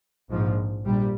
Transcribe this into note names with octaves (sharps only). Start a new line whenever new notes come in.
A#1 G#2 F3
A#1 A#2 G3